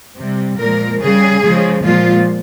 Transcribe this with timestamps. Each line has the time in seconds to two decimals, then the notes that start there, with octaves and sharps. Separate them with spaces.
0.16 C3 G3
0.58 A#2 F3 G#3 A#4
1.01 C#3 G3 G#4
1.42 C#3 F3 G#3
1.84 A#2 F3 G#3 F4